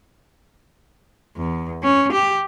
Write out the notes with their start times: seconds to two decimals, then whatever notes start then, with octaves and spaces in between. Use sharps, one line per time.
1.37 E2
1.83 C#4
2.12 G4